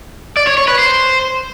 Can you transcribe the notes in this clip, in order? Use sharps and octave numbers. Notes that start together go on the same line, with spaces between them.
D5
C#5
C#5
B4
C5